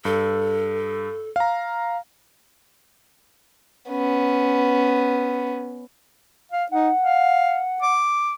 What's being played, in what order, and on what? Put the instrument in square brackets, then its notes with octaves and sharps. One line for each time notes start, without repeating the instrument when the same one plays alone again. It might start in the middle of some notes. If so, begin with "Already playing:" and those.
[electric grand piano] G2 [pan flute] A4
[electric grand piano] F5 A#5
[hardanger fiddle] B3 C#4
[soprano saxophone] F5
[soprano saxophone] D#4 [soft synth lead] F#5
[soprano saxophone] F5
D6